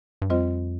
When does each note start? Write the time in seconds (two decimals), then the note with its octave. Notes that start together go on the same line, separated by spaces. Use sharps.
0.22 G2
0.30 F2 G3 C4 F4 C5 D#5